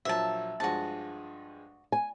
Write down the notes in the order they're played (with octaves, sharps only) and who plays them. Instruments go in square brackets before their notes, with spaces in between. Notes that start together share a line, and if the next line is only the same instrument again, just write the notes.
[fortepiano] A#1 F3 F#3 [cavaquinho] E5 A5
[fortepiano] G2 F3 G#3 [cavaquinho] F#4 A5
[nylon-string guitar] G#5